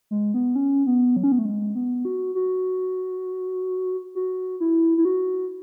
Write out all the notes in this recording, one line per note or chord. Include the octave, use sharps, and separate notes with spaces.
G#3
B3
C#4
B3
F#3
C#4
B3
A3
G#3
B3
F#4
F#4
F#4
E4
E4
F#4